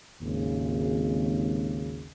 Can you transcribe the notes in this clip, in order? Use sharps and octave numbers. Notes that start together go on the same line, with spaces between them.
G#1 D#2 C#3